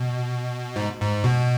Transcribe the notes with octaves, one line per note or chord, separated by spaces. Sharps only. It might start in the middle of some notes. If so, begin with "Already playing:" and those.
Already playing: B2
G#2
G#2
B2